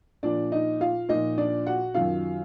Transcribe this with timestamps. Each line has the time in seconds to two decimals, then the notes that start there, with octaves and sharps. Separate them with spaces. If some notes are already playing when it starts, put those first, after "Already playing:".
0.23 A#2 F3 D4 D5
0.52 D#4 D#5
0.81 F4 F5
1.09 A#2 F3 D#4 D#5
1.38 D4 D5
1.67 F#4 F#5
1.94 F#2 D#3 F#3 F4 F5